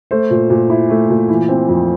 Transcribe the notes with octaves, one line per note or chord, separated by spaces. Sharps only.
A3 C5
A#2
A#2
E4
A3
A#2
E3
C4
F2